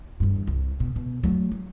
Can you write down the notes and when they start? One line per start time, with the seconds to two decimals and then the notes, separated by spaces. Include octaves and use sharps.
0.20 E2 G2
0.47 C2
0.80 B2
0.96 B2
1.24 F#3 A3
1.52 F#3